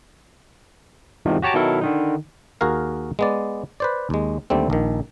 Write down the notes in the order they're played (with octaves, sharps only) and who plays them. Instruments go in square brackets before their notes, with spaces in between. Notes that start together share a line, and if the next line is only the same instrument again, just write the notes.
[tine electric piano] E2 G#2 C3 D#3 F3
F#4 G4 C#5 A5 A#5 D6
B2 D#3 F#3 E4 A4 A#4
D3 D#3 D#4
[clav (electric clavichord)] D#2 F#4 G#4 A#4 F5
G#3 B3 D5
B4 C5 D5
D#2 G#3
D#2 D3 G3 A3 C4
A#1 D#3